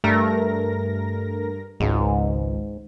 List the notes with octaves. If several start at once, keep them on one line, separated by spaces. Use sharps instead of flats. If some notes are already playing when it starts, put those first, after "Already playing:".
G2 A3 A#4 A#6
G#1 C#2 G#2